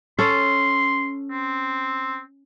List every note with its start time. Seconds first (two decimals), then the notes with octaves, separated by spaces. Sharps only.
0.19 C#4 A4 C6
1.31 C4